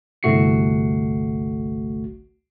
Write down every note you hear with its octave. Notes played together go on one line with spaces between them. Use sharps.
G1 C2 A3 F#4 C7 C#7